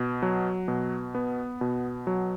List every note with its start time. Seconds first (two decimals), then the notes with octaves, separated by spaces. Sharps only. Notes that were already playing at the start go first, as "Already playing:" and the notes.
Already playing: B2
0.22 F#3
0.68 B2
1.15 B3
1.61 B2
2.07 F#3